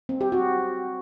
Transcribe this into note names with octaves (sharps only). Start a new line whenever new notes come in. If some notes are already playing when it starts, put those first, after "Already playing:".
C4
G4
F#4